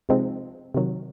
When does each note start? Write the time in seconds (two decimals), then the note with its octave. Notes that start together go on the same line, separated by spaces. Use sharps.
0.09 C3 F3 G#3 C4 D#4
0.74 C3 D#3 F#3